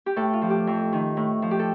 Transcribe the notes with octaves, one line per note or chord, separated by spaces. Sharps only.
G4
A2 A4
F4
F3
G4
F2
D#3
A2
F3
G4
A4